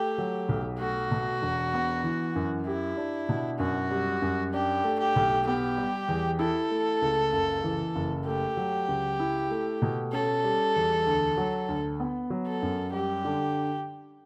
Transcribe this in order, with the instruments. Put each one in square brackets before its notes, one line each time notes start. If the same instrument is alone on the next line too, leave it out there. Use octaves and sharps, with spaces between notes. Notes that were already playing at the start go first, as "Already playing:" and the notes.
Already playing: [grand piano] A3 [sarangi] G4
[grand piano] F#3
B1
[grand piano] A3 [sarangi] F#4
[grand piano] B2
E1
B3
E3
F#2
[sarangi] E4 [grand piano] G4
[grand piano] D4
B2
[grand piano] F#2 [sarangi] F#4
[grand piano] G3
F#2
[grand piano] D4 [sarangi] G4
[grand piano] A3
[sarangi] G4
[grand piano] B1
[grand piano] B3 [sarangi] G4
[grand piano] G3
E2
[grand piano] E4 [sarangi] A4
[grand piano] A3
C#2
F#1
E3
F#1
[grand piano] A3 [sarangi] G4
[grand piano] F#3
C#2
E4
A3
B2
[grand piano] C#4 [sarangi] A4
[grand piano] G3
E2
D2
F#3
D2
B3
F#3
[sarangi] A4
[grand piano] F#2
[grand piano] G3 [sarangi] G4
[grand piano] D3